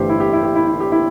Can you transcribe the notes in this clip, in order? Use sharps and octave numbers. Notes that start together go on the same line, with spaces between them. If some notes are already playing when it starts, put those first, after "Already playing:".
Already playing: G1 G2 E3 A3 G4 C5
E4
G4
E4
G4
E4
E4
G4
E4